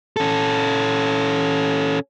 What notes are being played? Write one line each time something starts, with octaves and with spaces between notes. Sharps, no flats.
C#4 A4